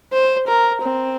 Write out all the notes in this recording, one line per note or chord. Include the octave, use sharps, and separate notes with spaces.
C5
A#4
C4